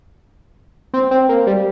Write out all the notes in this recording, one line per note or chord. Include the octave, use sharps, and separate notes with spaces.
C4
C4
A#3
G3